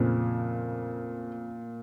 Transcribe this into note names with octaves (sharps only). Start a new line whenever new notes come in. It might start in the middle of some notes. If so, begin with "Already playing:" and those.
Already playing: F2 A#2 C#3 F3